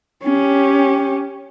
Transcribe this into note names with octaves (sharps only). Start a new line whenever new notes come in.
C#4 G4